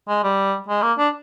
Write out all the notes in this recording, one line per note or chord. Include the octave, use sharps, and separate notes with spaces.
G#3
G3
G#3
A#3
D4